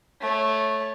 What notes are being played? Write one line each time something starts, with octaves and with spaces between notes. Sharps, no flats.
A3 C#5